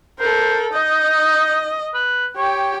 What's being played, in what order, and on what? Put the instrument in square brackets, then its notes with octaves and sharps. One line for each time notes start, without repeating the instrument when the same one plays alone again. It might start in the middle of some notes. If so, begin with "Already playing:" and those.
[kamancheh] A4 A#4 [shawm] C5
[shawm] D#4 [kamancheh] D#5
[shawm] B4
[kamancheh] G4 G5 [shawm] C#5